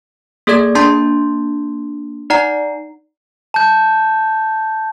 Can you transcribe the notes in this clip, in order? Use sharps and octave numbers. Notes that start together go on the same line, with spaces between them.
A#3 G#4 A4 D5 G#6
A#3 D4 A5 C6 G6 A6
D#4 D5 F#5 A#5 C7
A5 G6